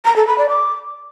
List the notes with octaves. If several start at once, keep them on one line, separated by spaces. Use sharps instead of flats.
A#5
A4
B5
D5
D6